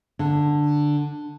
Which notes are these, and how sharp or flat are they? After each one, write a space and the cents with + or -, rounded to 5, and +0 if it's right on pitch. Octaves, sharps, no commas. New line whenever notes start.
D3 +5